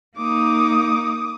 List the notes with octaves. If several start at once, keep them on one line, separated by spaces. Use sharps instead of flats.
A#3 D#4 D6 D#6